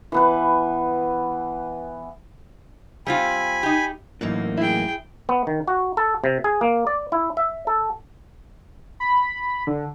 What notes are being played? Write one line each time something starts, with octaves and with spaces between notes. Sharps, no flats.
E3 B3 B4
G3 C4 F4 G#5 B5
D#4 G4
F#2 A2 E3 A#3 D#4
E4 G#4 G5
B3
D#3
F#4
A4
C3
G#4
A#3
D5
E4
E5
A4
B5
D3